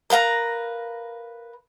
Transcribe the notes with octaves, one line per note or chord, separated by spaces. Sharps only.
A#4 B4 F5 A#5